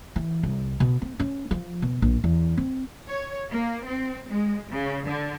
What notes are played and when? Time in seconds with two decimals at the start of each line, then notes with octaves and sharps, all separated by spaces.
0.16 E3
0.43 C2
0.80 B2
1.02 C4
1.20 C#4
1.51 F3
1.82 B2
2.02 A#1
2.24 E2
2.57 C4
3.07 C#5
3.50 A#3
3.84 C4
4.29 G#3
4.70 C#3
5.06 D3